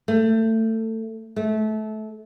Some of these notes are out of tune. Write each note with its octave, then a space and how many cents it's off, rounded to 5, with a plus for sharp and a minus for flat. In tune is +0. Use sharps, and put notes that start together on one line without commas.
A3 +20
A3 -25